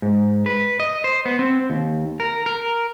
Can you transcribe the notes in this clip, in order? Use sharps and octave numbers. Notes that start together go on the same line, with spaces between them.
G#2
B4
D#5
C5
B3
C4
D#2
A#4
A#4